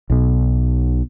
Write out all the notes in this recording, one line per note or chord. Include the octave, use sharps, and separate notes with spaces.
B1 B2